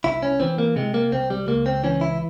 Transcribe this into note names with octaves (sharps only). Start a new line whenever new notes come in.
C2 E4
C#4
E3 C4
A#3
C3 G#3
A#3
C2 C4
G3
C#2 A#3
C4
E3 C#4
E4